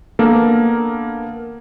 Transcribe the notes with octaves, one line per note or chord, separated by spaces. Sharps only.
A#3 B3 D4 A4 A#4